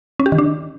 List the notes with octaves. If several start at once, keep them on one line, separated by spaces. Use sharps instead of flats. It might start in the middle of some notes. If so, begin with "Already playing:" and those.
C#4
G4
D#3
D4